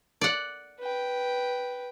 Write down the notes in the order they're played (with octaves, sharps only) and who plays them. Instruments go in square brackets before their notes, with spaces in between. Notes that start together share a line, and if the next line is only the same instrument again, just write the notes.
[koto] D5 F#5
[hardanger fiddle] B4 G5